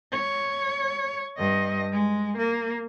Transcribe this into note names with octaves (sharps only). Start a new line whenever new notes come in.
C#5
G2 D#5
G#3
A#3